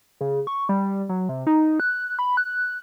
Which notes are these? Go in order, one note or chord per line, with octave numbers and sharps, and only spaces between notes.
C#3
C#6
G3
F#3
C3
D#4
F#6
B5
F#6